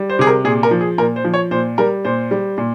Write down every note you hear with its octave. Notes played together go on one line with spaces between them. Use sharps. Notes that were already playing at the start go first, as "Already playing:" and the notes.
Already playing: G3
C5
C3 G#4
A#4
A#2 G#4
A#4
F3
G#4
A#2 A#4
C5
F3
C#5
A#2 C5
G3 A#4
A#2 C5
G3
A#2